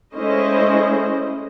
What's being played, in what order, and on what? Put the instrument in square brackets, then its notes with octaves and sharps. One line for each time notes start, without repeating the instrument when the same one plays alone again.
[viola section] G#3 A3 C#4 E4 C5 D#5